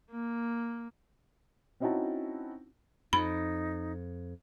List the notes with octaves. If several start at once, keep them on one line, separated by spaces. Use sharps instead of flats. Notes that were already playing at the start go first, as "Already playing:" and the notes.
A#3
C4 C#4 D#4 E4 F#4 A5
F2 D#4 B5